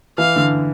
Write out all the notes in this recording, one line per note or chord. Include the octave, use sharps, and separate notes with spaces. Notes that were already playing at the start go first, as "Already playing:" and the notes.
E3 F5
D3